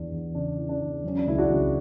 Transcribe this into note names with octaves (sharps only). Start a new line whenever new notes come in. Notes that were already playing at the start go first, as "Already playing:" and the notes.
Already playing: E2 E3 D4
E2
C#3 D4
E3
D4
E2
F#3 C#4
D4
C#2 E4
D4 F#4
C#2